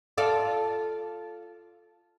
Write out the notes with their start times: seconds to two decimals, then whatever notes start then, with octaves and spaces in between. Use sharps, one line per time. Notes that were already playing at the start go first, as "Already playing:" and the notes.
0.18 F4 A4 D5